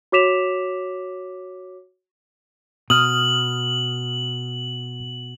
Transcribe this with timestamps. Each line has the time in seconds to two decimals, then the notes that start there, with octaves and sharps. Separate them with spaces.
0.12 F#4 C#5 D6 B6 E7 F7
2.90 B2 D#6 F6 F#7